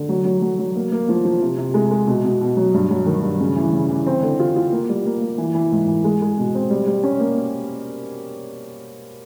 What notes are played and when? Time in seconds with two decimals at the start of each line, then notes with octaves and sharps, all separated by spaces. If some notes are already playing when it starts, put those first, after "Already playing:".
Already playing: D3
0.09 F#3
0.25 F#3
0.42 F#3
0.59 F#3
0.76 A#3
0.92 A#3
1.09 F3
1.25 F3
1.41 C3
1.58 C3
1.74 G#3
1.91 G#3
2.07 B2
2.24 B2
2.41 B2
2.57 F#3
2.74 G2
2.91 F#3
3.06 D#3
3.23 G2
3.40 C#3
3.56 E3
3.73 C#3
3.89 E3
4.06 C4
4.22 D3
4.40 F4
4.56 F4
4.72 A#3
4.89 G3
5.06 A#3
5.22 A#3
5.38 E3
5.55 E3
5.72 G#2
5.88 E3
6.04 G#3
6.22 G#3
6.38 B2
6.55 C4
6.70 G3
6.87 G3
7.03 C#4
7.20 A#3